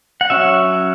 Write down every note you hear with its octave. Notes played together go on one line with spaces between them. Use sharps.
F#5
F#3 C#4 E5